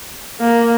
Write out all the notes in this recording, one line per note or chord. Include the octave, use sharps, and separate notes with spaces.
A#3